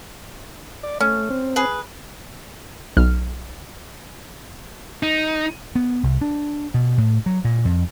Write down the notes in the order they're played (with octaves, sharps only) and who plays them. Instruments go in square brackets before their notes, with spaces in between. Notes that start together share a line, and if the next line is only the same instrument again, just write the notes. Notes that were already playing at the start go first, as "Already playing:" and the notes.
[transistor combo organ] D5
[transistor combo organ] A3 [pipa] C#4
[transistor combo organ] C4
[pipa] G#4 B4
[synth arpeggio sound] B1 F6
[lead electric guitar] D#4
[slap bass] B3
C2
D4
B2
A2
F#3
A#2
F2